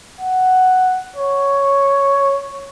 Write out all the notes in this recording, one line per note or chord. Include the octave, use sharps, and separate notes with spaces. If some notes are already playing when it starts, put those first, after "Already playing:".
F#5
C#5